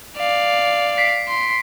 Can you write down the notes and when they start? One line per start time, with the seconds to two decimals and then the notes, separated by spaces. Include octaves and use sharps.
0.17 D5 F5
0.98 B6 C7 D7
1.28 C6